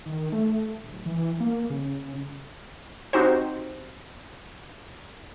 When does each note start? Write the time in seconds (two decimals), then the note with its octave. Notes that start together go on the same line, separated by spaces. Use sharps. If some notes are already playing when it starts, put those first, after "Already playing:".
0.06 D#3
0.32 A3
0.84 D1
1.06 E3
1.40 A#3
1.70 C#3
3.13 C4 D#4 F#4 G4 C5